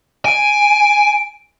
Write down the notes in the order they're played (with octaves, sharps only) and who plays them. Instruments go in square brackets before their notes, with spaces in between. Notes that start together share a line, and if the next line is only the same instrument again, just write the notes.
[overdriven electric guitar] G#5 [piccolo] D7